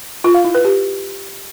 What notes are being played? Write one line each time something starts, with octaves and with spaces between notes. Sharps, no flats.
F4
F5
E4
B4
G4